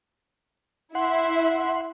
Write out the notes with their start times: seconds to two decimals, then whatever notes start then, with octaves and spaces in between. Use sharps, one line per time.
0.95 E4 E5 F#5 C6